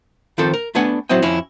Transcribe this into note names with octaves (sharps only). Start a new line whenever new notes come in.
D#3 F3 C4 F4 A4 C5
A#4
A3 B3 D4 B4 F#5 G#5
F#3 C4 E4 D#5 G5
F2 C#4 E4